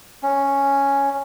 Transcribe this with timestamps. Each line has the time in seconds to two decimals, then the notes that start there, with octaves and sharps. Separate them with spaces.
0.23 C#4